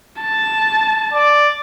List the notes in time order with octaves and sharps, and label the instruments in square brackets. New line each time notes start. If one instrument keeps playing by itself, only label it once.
[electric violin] A5
[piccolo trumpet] D5